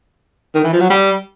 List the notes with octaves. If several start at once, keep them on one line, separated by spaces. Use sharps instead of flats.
D#3
E3
F3
F#3
G3